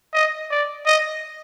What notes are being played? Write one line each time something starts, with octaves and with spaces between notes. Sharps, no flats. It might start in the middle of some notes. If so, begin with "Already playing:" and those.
D#5
D5
D#5